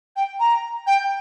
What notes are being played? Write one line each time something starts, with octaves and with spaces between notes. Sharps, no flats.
G5
A#5
G5